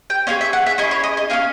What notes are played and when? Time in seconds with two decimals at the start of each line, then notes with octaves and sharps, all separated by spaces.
0.10 G5
0.27 C#4 E4 G#4 F5
0.41 E5
0.53 F#5
0.66 E5
0.78 C#4 E4 G#4 D#5
0.91 C#5
1.03 D#5
1.17 D#5
1.30 C#4 E4 G#4 F5